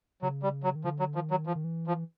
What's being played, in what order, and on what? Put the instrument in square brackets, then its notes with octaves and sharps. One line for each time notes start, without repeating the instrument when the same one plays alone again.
[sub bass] C#3 [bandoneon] F#3
[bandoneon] G3
F#3
[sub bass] D#3
[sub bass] D3 [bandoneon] F3
[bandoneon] F#3
[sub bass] D#3 [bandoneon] F3
[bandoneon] F#3
[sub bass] E3 [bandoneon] F3
[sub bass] D#3
E3
[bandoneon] F3